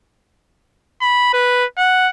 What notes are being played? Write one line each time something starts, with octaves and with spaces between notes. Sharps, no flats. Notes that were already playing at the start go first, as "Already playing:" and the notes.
B5
B4
F#5